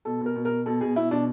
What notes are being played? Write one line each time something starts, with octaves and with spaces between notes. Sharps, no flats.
B2 A4
B2 A#4
B2
A#4
B2
B2 A4
B2 G#4
B2 E4
B2 D4